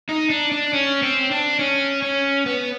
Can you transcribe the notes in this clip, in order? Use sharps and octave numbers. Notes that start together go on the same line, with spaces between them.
D#4
D4
D4
C#4
C4
D4
C#4
C#4
B3